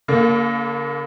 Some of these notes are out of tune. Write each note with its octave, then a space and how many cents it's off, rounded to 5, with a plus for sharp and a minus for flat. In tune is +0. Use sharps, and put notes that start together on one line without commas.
D3 -45 A#3 +0